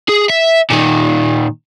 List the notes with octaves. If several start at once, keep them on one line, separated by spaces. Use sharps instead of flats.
G#4
E5
A#2 D#3